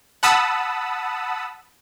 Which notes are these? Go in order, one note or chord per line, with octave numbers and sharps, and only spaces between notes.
F#5 A5 B5 D#6 E6